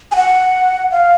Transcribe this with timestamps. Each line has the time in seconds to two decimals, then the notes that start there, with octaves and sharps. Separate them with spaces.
0.12 G#5
0.16 F#5
0.92 F5